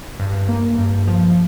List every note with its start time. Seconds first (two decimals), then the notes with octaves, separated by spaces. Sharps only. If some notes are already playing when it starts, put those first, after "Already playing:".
0.20 G2
0.49 A#3
0.78 G2
1.08 F3